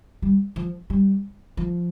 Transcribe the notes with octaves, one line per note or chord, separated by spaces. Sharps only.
G3
F3
G3
F3